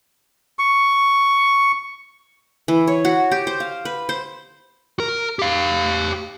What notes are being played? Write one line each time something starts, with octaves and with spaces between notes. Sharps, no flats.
C#6
E3
C#5
F#4
G4
C5
F5
B4
C5
A#4
G4 F5